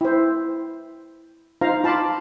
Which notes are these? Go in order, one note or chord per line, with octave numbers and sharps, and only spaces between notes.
E4 C5
D#4 F4 C5 F5 A#5
F4 A5 B5 C6 D6